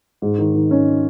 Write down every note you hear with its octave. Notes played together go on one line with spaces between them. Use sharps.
G#2
D#3
D#3
C#4